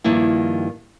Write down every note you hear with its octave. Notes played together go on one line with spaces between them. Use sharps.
G2 D#3 F3 A#3 E4